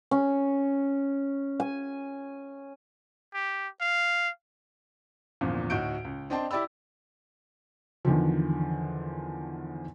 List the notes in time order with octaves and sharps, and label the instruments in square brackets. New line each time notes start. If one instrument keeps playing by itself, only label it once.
[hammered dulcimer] C#4
G#5
[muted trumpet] G4
F5
[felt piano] G#1 E2 A#2 D3 F3
D2 A2 D#4 F#4 G6 D7
C#2
C4 D4 D#5 G5 A5 C6
E4 G4 D5 G5 B5 E6
E2 D3 D#3 F3